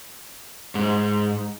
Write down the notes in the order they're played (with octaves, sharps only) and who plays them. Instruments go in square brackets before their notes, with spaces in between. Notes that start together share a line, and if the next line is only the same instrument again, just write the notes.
[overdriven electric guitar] G#2